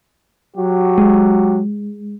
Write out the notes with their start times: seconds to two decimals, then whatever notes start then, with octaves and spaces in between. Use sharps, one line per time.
0.57 F#3 F#4 G4
0.98 G#3